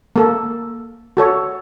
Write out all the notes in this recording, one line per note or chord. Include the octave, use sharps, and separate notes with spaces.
A#3 A4
F#4 A4 C#5